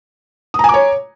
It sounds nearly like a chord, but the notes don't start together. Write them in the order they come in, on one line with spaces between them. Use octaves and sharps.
D#6 A#5 G#5 D6 C#5